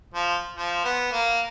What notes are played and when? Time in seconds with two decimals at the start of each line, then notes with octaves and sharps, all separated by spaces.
0.14 F3
0.56 F3
0.85 B3
1.11 A#3